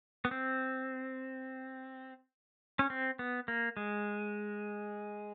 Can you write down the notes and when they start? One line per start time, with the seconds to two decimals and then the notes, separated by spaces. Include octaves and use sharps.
0.25 B3
0.31 C4
2.79 C#4
2.90 C4
3.19 B3
3.48 A#3
3.77 G#3